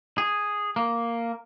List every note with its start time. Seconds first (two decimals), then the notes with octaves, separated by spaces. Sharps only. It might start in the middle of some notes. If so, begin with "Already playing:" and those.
0.18 G#4
0.76 A#3